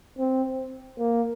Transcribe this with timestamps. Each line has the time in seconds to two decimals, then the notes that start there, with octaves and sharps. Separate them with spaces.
0.19 C4
0.99 A#3